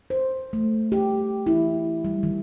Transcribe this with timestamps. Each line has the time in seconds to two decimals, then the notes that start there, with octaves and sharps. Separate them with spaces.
0.10 C5
0.53 A3
0.92 G4
1.47 E4
2.05 G3
2.23 D#3